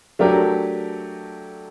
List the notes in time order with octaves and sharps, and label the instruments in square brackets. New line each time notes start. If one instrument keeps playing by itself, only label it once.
[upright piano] F#3 A3 D4 G4 A#4